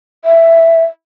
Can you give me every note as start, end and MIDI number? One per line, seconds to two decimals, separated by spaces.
0.25 0.83 76